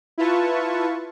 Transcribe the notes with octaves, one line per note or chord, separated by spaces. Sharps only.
E4 F4 B4 A5 C#6